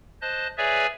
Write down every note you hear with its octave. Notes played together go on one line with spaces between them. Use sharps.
C5 D#5 A5 F#6
G#4 B4 C#5 D5 E5 G#5